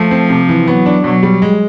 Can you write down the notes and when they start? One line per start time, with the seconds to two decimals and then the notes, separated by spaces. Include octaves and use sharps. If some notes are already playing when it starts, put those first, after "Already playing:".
Already playing: F3 A3
0.11 C4
0.30 C3
0.49 E3
0.68 F#3 B3
0.86 D4
1.04 B2 F#3
1.23 G3
1.42 G#3